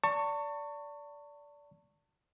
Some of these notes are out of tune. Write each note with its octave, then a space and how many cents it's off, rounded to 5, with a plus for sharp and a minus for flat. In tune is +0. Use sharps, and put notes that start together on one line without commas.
D5 -20 A5 +35 C#6 +0